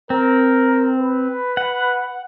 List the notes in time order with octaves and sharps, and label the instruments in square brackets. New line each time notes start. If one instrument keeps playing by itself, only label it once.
[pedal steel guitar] C4 [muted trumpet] A#4
[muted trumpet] B4
[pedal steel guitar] F#5